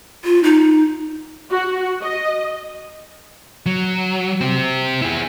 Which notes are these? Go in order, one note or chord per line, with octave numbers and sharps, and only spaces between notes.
F4
D#4
F#4
D#5
F#3
C4 G4
E4 G#4